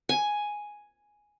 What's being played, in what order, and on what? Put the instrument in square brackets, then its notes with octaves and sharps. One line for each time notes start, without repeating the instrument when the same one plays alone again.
[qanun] G#5